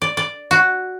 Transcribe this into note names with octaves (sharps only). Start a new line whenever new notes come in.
D5
D5
F#4